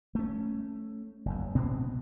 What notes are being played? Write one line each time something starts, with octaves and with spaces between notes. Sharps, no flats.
A3 C#4
F#1 E2
B2 B3 C4